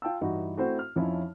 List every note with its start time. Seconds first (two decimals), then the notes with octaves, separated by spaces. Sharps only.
0.02 F4 G5 A5 E6
0.21 G2 E3 D#4 E4 F#4
0.57 A3 C4 E4 F#4 C5
0.79 F6
0.96 F2 F3 C#4 D#4 E4 C#5